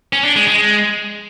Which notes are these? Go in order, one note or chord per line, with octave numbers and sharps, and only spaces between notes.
C#4
D4
G#3
G#3